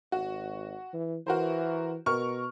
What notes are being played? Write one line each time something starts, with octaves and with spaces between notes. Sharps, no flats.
G#1 F#4
E3
E3 F#4 A#4 C5
B2 A#4 C#6 F6